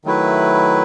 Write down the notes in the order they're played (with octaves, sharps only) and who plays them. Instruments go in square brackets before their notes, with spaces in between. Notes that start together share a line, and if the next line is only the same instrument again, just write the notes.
[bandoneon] D#3 F#3 A3 E4 B4